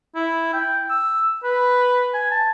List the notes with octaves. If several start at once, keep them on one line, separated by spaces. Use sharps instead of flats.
E4
G5
E6
B4
G#5
A5